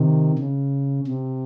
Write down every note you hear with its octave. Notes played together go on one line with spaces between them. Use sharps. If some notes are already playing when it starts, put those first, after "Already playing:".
Already playing: C3 D#3
C#3
C3